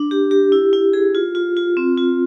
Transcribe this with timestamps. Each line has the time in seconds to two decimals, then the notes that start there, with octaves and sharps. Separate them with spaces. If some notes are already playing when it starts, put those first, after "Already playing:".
Already playing: D4
0.11 G4
0.31 G4
0.52 E4
0.73 E4
0.93 G#4
1.15 F4
1.35 F4
1.57 F4
1.77 C4
1.97 F4